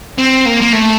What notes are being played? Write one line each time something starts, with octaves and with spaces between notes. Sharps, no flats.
C4
A#3
A#3
A3